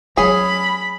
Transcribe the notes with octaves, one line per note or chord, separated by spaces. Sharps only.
F#3 C#4 G#4 B5